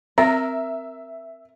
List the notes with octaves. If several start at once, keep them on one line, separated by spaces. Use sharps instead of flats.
C4 A#4 E5